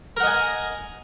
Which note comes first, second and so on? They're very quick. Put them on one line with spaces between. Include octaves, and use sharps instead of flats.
A#4 F#5 D#5 G#5